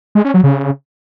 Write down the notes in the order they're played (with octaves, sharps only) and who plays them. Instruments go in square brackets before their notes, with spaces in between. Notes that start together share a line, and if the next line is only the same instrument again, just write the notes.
[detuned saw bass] G#3
C#4
F#3
C#3